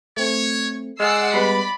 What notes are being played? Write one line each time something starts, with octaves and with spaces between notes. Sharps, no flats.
A3 C4 C#5
G#3 G#4 D5 F#5 E6 F6 C7
G3 B3 B4 B5